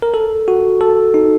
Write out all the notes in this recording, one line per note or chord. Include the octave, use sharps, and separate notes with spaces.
A#4
A4
F#4
A4
D#4